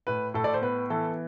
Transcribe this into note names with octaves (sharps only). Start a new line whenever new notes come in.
A2 B4
A2 A4
D5
C5
B3 B4
E3 A4